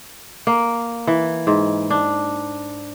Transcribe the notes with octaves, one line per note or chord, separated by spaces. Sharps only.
A#3
E3
G#2
D4